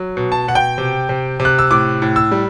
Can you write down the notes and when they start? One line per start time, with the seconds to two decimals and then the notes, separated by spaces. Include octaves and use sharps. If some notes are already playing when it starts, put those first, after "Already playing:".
Already playing: F#3
0.17 B2
0.32 A5
0.48 B2 F#5
0.55 G5
0.78 C3
1.09 C3
1.40 C3
1.45 F#6
1.59 E6
1.71 A2 D6
2.02 A2
2.16 E6
2.32 G3